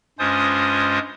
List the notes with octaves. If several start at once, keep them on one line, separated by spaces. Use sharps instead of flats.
G2 G#3 C#4 F4 C5 D#6